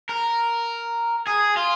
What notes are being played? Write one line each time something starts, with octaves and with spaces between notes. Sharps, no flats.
A#4
G#4
F4